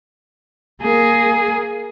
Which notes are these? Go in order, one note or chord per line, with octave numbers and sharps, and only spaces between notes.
A#3 G#4